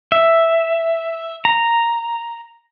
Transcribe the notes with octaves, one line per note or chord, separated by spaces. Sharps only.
E5
A#5